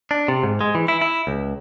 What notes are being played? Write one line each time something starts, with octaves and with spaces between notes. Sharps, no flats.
D4
C3
G#2
G#3
E3
E4
E4
C#2